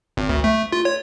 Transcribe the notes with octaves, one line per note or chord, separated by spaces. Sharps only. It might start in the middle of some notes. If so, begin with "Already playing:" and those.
G#1
D2
A3
F4
C#5